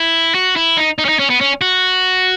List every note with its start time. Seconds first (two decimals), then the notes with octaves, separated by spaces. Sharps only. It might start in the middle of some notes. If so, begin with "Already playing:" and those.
Already playing: E4
0.35 F#4
0.56 E4
0.77 D#4
0.98 D#4
1.05 C#4
1.09 D#4
1.19 C#4
1.30 B3
1.41 C#4
1.61 F#4